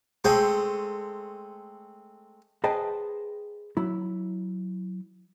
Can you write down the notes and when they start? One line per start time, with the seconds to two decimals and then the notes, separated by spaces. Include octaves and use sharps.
0.24 G#3 A3 C4 G#4
2.64 G#4 B4 C5 D#5 G5 A5
3.77 F#3 E4